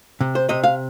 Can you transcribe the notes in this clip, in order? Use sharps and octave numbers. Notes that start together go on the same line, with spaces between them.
C3
C5
C3 D#5
F5